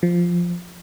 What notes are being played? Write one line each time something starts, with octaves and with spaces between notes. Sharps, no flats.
F3